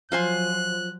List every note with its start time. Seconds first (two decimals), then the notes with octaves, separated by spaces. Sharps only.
0.12 F3 F#3 F4 C5 G#5 F#6